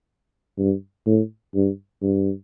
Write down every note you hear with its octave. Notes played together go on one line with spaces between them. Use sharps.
G2
A2
G2
G2